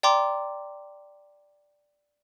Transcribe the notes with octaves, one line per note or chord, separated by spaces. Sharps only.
D5 G5 A#5 C6 D6